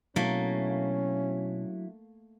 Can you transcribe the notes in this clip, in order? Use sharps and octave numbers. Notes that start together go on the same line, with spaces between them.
B2 F#3 A3 A#3 C#4 D4 E4